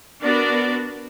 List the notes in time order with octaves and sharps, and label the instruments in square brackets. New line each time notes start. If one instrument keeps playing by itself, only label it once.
[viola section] B3 D4 F#4 A#4 D5